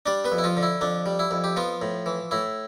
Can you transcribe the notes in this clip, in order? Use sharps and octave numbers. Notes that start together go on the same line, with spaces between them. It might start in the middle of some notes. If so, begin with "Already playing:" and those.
G3 D4 D5
B3 B4
F2
E4
F3 F4
D3
E4
F2 D4
G3
E4
F2
G4
F3 B3 F4
A2
E3
A2 E4